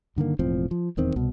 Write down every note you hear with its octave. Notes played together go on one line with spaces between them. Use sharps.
G2 D3 D#3 A#3
E1 A2 F3 C4
F3
D#1 E2 D#3 C4
C2 B2